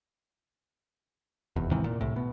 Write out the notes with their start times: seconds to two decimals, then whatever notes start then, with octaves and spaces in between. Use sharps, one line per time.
1.56 F1 E2
1.71 G#2 C3 D#3 E3
1.84 A#2
2.01 C2 A2
2.16 B2